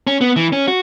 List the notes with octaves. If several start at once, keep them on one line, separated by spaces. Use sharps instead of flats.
C#4
B3
E3
C#4
F#4